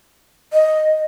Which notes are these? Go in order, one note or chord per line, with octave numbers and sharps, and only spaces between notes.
D#5